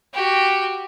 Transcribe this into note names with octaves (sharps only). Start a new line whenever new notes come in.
F#4 G4